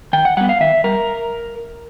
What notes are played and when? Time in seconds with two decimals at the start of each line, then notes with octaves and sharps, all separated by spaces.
0.13 D#3 G5
0.25 F#5
0.37 G3 B3 F#5
0.49 F5
0.60 D#3 E5
0.84 G3 A#4